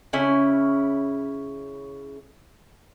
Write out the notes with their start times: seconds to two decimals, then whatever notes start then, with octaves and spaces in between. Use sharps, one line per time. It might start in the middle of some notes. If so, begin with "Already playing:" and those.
0.13 C#3 C#4 E4 G#5